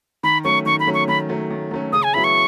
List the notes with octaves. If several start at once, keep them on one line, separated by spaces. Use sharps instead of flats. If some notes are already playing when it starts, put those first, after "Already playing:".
D#3 B5
F#3 A3 C#4 C#6
D#3 C#6
B5
F#3 A3 C#4
C#6
D#3 B5
F#3 A3 C#4
D#3
F#3 A3 C#4
C#3 D#6
G#5
F#3 B3 E4 G#4 B5
C#6